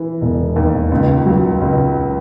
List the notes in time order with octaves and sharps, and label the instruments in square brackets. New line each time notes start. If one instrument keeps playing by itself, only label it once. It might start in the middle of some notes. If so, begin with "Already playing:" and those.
Already playing: [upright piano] E3
E1
D#2
C#2
F#3
C#2